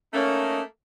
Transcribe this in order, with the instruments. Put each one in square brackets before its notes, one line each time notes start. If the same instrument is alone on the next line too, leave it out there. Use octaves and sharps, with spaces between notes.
[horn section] A3 A#3 D#4 [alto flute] C#4